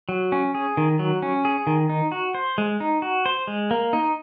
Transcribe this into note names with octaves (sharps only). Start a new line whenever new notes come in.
F#3
C#4
G#4
D#3
F#3
C#4
G#4
D#3
D#4
F#4
C5
G#3
D#4
F#4
C5
G#3
A#3
D#4